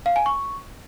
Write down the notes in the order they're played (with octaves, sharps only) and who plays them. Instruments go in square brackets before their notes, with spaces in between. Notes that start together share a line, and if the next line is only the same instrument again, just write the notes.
[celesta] F5
G#5
C#6